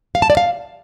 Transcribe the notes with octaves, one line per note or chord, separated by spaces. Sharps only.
F5
A5
D5
F5